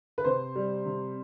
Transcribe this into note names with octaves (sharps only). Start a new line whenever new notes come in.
B4
C3 C5
G3
C3